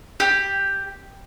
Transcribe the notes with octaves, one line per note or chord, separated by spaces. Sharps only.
G4